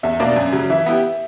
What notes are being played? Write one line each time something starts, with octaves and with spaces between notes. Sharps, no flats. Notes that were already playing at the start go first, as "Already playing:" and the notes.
E2 E5
B2 A#3 D4 D5
F#2
C#3 F#3
E3 E5
B3 E4 G4